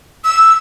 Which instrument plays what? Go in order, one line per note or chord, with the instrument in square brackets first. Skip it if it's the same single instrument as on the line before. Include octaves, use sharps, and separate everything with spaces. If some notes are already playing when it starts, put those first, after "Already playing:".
[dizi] E6